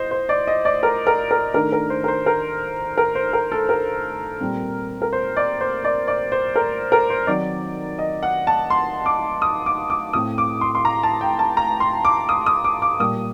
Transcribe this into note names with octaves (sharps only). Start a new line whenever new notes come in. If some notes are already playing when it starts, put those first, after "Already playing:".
Already playing: A2 C5 D#5
C5
D5
D#5
D5
A#4
A#4
A#4
D#3 A3 D4 A#4
A#4
C5
A#4
C5
A#4
A#4
C5
A#4
A4
A#4
A#2 G3 C4
A#4
C5
D5
C5
D5
D5
C5
A#4
A#4
C5
D#3 F#3 C4 D#4 D5
D#5
F#5
A5
C6
D6
D#6
D6
D6
A2 A3 C4 D#6
D6
C6
C6
A#5
A5
G5
A5
A#5
C6
D6
D#6
D#6
D6
D6
A#2 G3 A#3 D#6